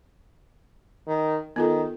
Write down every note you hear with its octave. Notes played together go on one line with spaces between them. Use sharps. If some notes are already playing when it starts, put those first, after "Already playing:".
D#3
D#3 B3 F4 A4